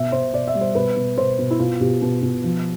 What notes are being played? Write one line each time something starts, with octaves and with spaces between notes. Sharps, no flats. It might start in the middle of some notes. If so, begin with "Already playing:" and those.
Already playing: B2 E5
B2 C5
B2 D5
E5
G3
C5
B2 B4
B2
B2 C5
B2
E4
B2 F4
B2 G4
B2
B2
F3